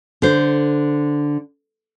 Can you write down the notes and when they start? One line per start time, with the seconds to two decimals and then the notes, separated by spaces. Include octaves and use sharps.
0.22 D3 C5